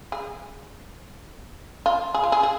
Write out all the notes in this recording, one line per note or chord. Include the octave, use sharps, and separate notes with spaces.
G#4
F4
G#4
F4
G#4
G#4